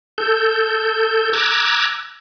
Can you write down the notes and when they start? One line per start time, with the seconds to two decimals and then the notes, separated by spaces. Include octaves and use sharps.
0.18 A4 G6
1.33 A#5 D6 E6 F#6 G#6